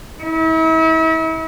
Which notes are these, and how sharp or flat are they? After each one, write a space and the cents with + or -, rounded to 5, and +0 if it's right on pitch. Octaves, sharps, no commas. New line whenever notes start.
E4 -40